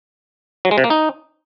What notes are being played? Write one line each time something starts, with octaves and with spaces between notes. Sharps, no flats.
F#3
G#3
C3
A#3
D#4